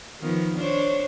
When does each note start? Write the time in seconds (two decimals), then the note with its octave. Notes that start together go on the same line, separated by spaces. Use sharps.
0.21 D#3 F3 B3
0.58 D4 C5 C#5